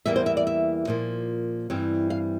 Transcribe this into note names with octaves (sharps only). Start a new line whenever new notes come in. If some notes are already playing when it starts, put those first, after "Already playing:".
E2 E3 G3 A#3 E5
C5
E5
D5
E5
A#2 F3 A#3
G2 E3 G3 C4
F5